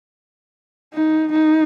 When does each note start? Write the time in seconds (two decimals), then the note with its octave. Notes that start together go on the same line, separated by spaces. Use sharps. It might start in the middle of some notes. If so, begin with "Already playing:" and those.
0.94 D#4
1.32 D#4